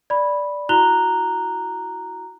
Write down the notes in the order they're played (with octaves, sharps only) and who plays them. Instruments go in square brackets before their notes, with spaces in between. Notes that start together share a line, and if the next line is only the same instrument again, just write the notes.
[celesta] D5 B5
E4 F#4 A#5 F#6 F7 G7